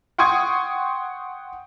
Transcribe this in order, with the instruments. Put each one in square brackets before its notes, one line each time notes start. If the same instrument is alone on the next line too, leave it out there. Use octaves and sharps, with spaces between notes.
[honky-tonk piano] F#5 G5 C6 C#6 D#6 G#6